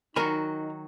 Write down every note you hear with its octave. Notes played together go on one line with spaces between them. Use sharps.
D#3 F#3 D#4 F#4 A#4 G#5 B5